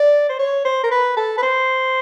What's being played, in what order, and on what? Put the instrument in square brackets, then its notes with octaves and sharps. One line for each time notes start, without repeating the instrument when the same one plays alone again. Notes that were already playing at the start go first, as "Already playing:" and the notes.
Already playing: [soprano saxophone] D5
C5
C#5
C5
A#4
B4
A4
B4
C5